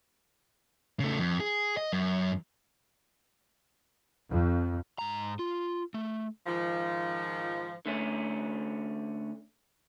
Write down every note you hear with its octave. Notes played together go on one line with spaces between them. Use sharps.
C#3 A3
F2
G#4
D#5
F#2
F2
G#2 A#5
F4
A3
G#2 D#3 F3
D3 A3 C#4